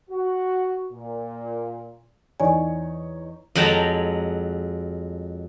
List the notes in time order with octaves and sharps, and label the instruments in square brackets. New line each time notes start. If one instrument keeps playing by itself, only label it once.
[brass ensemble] F#4
A#2
[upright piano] E2 D#4 C#5 [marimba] D5 G#5
[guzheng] F2 F#3 G#3 G5 A5 A#5